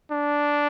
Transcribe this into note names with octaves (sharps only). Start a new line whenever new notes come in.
D4